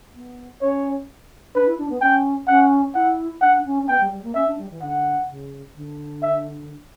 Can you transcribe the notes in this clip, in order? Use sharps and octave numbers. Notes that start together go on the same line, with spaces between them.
B3
C#4 C#5
D4 B4
E4
D4
B3
C#4 G5
C#4 F#5
E4 F#5
D4 F#5
C#4
C#4
B3 G5
G3
G3
A#3
C#4 E5
D4
G3
E3
D3 F#5
C#3
D3
E5